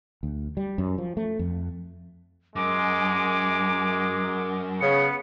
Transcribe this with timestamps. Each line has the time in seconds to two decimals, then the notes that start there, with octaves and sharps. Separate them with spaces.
0.23 D2
0.57 G3
0.78 F#2
0.98 F3
1.17 A3
1.39 F2
2.56 F#2 G#3 D6
4.81 C#3 B3 C#7